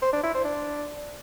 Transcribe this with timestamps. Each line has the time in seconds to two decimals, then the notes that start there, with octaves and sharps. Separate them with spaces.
0.02 C5
0.13 D4
0.23 E4
0.34 C5
0.45 D4